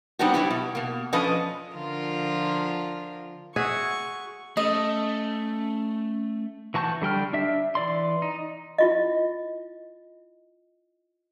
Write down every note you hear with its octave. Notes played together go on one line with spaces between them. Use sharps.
G3 B3 C4 D4 D#4 F#4
F#3 E4 F#4 G4
B2
B2 A#3
F3 C#4 D4 A4 B4 D#5
D3 F3 F4 A#4
F#4 G#4 E5 C#6
A3 C#4 D#5
E3 F#4 A5 C#6 G6
D3 G3 G5 F6
D4 E5
E3 D5 C6
D#4
E4 F4 D#5